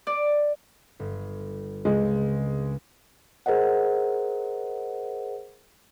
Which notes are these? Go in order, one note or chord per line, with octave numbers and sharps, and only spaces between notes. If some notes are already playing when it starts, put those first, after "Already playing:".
D5
G1
C#2 G#3 C4
G#4 A#4 C5 D#5 F#5